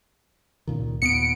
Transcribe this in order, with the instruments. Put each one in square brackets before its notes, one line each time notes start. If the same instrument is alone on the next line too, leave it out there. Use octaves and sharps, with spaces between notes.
[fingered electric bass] C#2 A#2 D#3
[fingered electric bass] D#2 A#2 B3 [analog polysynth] C#7 D7